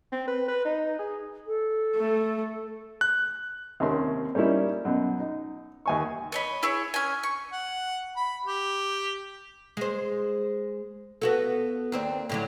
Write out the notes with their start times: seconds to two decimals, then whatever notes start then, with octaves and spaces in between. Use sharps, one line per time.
0.12 C4
0.27 B4
0.48 B4
0.65 D#4
0.99 G#4
1.47 A4
1.97 A3
3.01 F#6
3.80 D#2 C3 C4 C#4 A#4 C6
4.35 G3 A#3 C#4 D#4 E4
4.85 F#2 B2
5.20 D#4
5.86 D#2 G#5 C#6
6.32 C#5 D#5 B5
6.63 E4 G#4 C#5
6.94 C#4 G#5
7.23 C#6
7.52 F#5
8.17 B5
8.45 G4
9.77 G#3 C5
11.22 B3 F#4 A4
11.92 D#2 C4 D4
12.30 A2 D3 F#3